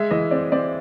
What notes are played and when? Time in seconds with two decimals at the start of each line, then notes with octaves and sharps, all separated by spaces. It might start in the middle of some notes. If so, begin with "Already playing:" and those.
Already playing: G#3 E5
0.11 E3 D#5
0.31 C4 D5
0.52 C4 D5